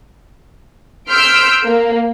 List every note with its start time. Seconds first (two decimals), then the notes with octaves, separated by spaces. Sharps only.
1.10 C6 E6 F6 G6 B6 D7
1.66 A#3